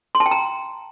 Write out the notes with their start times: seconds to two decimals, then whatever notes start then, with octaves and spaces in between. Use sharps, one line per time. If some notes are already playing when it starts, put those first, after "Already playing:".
0.15 C6
0.20 A5
0.26 G5
0.31 A#5